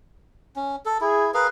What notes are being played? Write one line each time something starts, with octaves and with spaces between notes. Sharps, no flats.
C#4
A4
E4 G#4
G#4 A#4 B4 F5